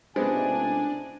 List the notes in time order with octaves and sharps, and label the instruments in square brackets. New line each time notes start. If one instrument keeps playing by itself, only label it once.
[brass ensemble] C#2 A2 C3 [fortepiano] G#3 B3 C4 [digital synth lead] D4 [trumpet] G#5